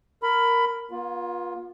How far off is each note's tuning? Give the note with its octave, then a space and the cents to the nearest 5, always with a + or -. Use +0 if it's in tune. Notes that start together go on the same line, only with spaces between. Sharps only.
A#4 +0 B5 +15
B3 -45 F4 +15